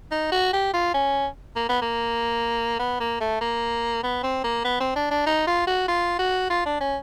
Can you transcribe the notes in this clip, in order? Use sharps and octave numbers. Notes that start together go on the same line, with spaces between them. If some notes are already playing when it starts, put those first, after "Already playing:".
D#4
F#4
G4
F4
C#4
A#3
B3
A#3
B3
A#3
A3
A#3
B3
C4
A#3
B3
C4
D4
D4
D#4
F4
F#4
F4
F#4
F4
D4
C#4